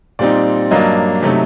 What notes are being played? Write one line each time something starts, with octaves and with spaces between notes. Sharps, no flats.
A#2 G3 C4 D#4 D5
G2 F#3 A#3 D4 D#5
C3 F#3 A3 D#4